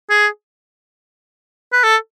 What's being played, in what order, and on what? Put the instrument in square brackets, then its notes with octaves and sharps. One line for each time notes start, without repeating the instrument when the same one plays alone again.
[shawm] G#4
B4
A4